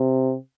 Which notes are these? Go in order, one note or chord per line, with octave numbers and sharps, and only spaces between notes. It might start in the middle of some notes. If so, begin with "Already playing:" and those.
Already playing: C3